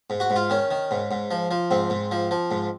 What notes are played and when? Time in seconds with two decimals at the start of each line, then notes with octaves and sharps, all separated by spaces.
0.10 G#2
0.20 F#4
0.30 G#2
0.36 F4
0.50 D#3 C#4
0.71 D#3
0.91 G#2
1.11 G#2
1.31 F3
1.51 F3
1.71 G#2 C4
1.90 G#2
2.11 F3
2.31 F3
2.51 G#2